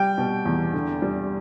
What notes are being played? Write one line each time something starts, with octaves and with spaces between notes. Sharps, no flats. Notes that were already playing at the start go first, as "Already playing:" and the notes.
Already playing: G3 G5
B2
E2
D3
G3